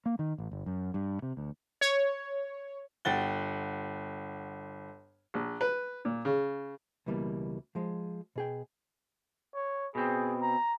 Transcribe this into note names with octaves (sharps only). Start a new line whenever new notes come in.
A#3
D#3
A1
G1
F#2
G2
C3
D2
C#5
G1 F#5 G5 A6 G7
A#1
B4
A#2
C#3
C#2 B2 E3 G3 A#3
F3 G#3
B2 G#4 G5
C#5
B2 C4 G#4
A#5